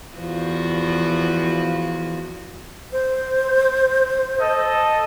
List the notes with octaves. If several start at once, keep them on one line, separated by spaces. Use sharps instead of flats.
E2 F3 F#4
C5
A4 D#5